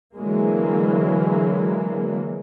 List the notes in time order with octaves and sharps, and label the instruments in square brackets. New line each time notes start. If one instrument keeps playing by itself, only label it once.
[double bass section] D3 E3 F#3 G#3 A#3